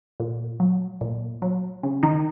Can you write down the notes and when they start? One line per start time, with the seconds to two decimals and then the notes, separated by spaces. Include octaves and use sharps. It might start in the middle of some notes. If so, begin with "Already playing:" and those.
0.20 A#2
0.60 F#3
1.01 A#2
1.42 F#3
1.83 C#3
2.03 D#3 D#4